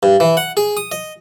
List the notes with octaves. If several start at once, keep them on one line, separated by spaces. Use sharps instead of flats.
G2
E3
F#5
G#4
D#6
D#5